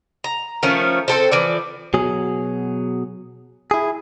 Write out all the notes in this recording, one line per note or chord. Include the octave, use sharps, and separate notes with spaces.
A#5
D#3 F3 A3 C#4
C4 A4 C5
E3 F3 D5
B2 F#3 G#4
E4 G#4